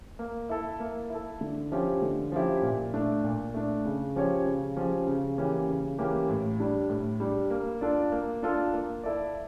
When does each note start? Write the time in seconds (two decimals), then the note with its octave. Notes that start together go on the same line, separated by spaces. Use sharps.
0.19 A#3
0.49 E4 A4
0.80 A#3
1.10 E4 A4
1.41 D3
1.72 F3 C#4 E4 G4
2.02 D3
2.32 F3 C#4 E4 G4
2.62 A#2
2.94 A3 D4
3.24 A#2
3.54 A3 D4
3.85 C#3
4.16 F3 C#4 G4 C#5
4.46 C#3
4.77 F3 C#4 G4 C#5
5.07 C#3
5.38 E3 A#3 C#4 G4
5.68 C#3
5.98 E3 A#3 C#4 G4
6.29 A2
6.60 G3 D4
6.90 A2
7.20 G3 D4
7.50 A#3
7.81 D4 F4 A4 D5
8.12 A#3
8.43 D4 F4 A4 D5
8.73 A#3
9.04 E4 A4 D5